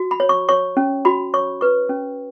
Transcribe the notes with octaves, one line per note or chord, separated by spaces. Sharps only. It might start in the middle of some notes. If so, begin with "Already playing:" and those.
Already playing: F#4
B5
C#5
C#6
C#5 C#6
C#4
F#4 B5
C#5 C#6
B4 C#6
C#4